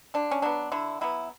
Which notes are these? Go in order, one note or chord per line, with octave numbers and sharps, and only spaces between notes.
D3 D4
C#4
F#3 B3 D4
D3 E4
F#3 B3 E4